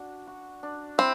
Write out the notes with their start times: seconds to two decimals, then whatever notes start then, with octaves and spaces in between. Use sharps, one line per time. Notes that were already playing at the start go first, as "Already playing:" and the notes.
Already playing: D4 F#4
0.27 F#4
0.63 D4
0.98 C4 E4